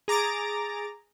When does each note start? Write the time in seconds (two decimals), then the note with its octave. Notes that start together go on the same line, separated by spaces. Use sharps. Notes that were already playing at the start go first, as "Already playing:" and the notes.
0.08 G#4 A#5 D6 A6 D7